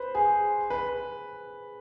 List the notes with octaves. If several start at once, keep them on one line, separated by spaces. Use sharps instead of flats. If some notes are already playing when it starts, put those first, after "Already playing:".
Already playing: B4 C5
G#4
B4